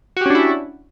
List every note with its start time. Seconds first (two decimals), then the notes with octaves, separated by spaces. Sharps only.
0.17 F#4
0.21 G4
0.26 C#4
0.30 D4
0.35 E4